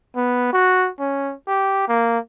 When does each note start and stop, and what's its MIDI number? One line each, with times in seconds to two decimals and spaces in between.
0.16 0.50 59
0.53 0.89 66
1.00 1.33 61
1.47 1.84 67
1.88 2.19 58